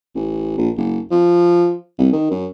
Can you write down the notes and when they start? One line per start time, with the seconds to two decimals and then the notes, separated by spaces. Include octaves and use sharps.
0.15 A1
0.58 A#1
0.77 F#1
1.11 F3
1.99 C2
2.13 D#3
2.31 F#2